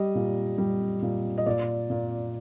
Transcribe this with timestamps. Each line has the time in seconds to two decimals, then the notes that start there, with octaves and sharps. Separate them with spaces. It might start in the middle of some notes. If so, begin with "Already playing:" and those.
Already playing: G3 D#5
0.15 A#2
0.58 G3
1.02 A#2
1.38 D#5
1.46 A#2 D5
1.90 A#2